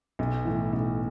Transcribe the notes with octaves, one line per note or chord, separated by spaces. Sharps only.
B1
A2 E3
B1